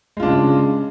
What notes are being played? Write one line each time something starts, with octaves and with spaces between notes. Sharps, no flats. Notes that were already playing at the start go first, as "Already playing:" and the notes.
C#3 G#3 D4 F4